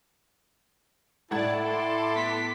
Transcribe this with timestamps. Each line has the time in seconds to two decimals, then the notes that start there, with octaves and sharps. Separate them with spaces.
1.31 A2 E4 D5 F#5 A5 G#6
1.64 A4 C6 D6
2.15 B3 B6